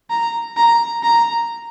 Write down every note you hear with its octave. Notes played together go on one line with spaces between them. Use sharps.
A#5
A#5
A#5